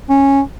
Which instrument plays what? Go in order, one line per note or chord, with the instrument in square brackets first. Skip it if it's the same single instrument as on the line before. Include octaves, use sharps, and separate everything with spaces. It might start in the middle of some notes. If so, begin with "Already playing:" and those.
[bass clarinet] C#4